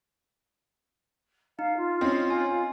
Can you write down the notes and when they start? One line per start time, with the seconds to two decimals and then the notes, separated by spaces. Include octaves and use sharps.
1.59 D#4 F5
1.77 F4
2.01 C4 C#4 D#5
2.30 G#5